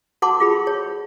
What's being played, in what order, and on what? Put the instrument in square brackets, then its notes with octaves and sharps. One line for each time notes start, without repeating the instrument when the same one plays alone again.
[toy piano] F#4 A4 F#5 A5 C6 D6
F4 G#4 B5
C#5